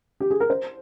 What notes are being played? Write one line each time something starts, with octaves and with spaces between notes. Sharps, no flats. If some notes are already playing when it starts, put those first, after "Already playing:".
G4
G#4
A#4
C5